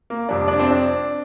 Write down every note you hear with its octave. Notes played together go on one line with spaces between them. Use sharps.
A#3
F2 C3 G3 D4
D4
C4
D4